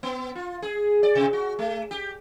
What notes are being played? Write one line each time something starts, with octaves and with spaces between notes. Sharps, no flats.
B3
F4
G#4
D5
C3
F#4
A3
G4